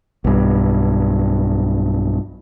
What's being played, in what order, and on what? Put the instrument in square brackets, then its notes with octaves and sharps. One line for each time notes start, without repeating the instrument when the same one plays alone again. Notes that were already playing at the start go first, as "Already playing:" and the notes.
[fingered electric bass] B1 G2